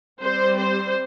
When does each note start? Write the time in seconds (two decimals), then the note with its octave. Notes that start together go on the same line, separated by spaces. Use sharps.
0.22 G3 C4 C5
0.59 C5